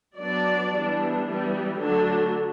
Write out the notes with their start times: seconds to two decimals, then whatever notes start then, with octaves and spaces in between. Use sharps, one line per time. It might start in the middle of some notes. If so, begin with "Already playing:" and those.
0.17 F#3 B3 D4 D5
0.71 E3 G3 B3 D4
1.25 E3 G3 B3
1.79 D3 F#3 A3 D4